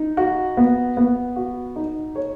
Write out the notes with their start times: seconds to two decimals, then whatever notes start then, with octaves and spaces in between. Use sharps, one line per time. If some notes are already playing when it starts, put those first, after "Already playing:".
Already playing: D#4
0.17 F#4
0.57 B3
0.97 B3
1.36 F#4
1.76 D#4
2.15 C#5